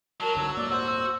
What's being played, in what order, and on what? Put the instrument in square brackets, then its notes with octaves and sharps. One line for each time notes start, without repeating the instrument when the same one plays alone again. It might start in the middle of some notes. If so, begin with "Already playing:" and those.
[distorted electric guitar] F#3 [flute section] A#4 [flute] A5
[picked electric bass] C2 G#2 D3 [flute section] E6
[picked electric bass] D#1 G#2 A#3 [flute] D5
[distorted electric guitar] F#4 [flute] C5